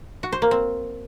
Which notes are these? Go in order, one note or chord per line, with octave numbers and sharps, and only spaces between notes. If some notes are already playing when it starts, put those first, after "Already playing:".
F#4
C5
A#3
C4